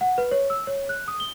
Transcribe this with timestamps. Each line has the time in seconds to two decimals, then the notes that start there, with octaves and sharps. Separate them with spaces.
0.01 F#5
0.18 B4
0.31 C#5
0.50 E6
0.67 C#5
0.89 F#6
1.08 D#6
1.20 G7